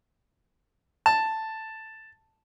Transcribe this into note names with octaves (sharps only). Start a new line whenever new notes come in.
A5